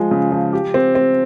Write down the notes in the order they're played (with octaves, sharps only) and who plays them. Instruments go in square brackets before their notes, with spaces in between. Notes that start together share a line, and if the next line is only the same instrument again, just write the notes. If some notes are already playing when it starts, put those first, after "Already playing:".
Already playing: [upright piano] F3 G#3
C#3
F3
G4
C4
C4